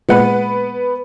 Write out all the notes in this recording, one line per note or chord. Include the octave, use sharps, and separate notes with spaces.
A#2 G#3 B3 B4 F#5